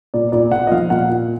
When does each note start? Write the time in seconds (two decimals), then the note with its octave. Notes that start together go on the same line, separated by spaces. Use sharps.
0.14 A#2 D5
0.32 A#2 D5
0.52 A#2 F#5
0.67 D#5
0.71 F3 F5
0.90 A#2 F#5
1.09 A#2